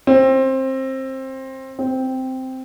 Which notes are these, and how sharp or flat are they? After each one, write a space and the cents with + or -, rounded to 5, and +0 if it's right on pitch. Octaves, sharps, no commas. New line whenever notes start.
C4 +20
C4 -5